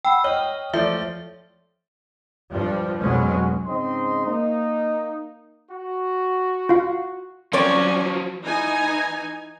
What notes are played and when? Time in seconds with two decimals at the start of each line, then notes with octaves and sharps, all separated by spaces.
0.05 F#5 G5 B5 E6
0.24 C#5 D#5 F6 G7
0.74 F3 A3 D5 E5
2.51 G2 F3 G3
3.00 B1 F2 B2 F#3 G#3 C#4
3.67 G#2 C#3 C4 D#4 D#5 C6
4.26 A#3 D#4
5.71 F#4
6.69 F4 F5
7.53 F3 F#3 C4 C#4 C#5 D5 G#5
8.41 E3 D#4 G#5